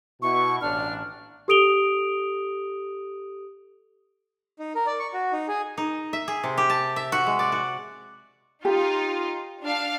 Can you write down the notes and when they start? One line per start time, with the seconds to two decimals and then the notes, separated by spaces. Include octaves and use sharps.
0.22 B2 E4 C#6
0.61 A1 D4 F6
1.48 G4 A4 D#6 D7 F7 G7
4.59 D#4
4.75 A#4
4.86 D5
4.99 C#6
5.14 F#4
5.32 D#4
5.48 G#4
5.78 D#4
6.13 E5
6.28 G#4
6.44 C3
6.57 G4
6.70 A5
6.96 E5
7.12 F#4
7.27 G#3
7.39 D5
7.52 F#4
8.65 D#4 F4 G4
9.63 D4 F5